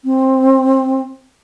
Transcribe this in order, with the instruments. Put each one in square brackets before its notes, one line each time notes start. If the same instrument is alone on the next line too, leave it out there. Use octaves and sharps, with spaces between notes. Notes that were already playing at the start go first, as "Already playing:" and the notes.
[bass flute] C4